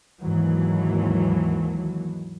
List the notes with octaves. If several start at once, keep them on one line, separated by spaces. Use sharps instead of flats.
D#2 G#2 E3 F#3